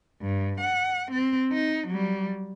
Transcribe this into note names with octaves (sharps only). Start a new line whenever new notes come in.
G2
F#5
C4
D#4
F#3 G3